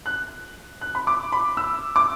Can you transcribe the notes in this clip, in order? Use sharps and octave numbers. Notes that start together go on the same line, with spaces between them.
F#6
F#6
B5
D6
B5
E6
D6